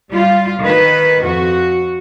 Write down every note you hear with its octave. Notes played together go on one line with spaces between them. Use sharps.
G3 F4
D#3 B4
F2 F#4